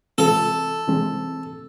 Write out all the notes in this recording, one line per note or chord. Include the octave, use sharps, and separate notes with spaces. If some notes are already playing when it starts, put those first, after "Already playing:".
C3 E3 G#3 C4 F4 A4
C3 E3 G#3 C4